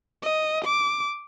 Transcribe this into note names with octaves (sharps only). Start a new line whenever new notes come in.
D#5
D6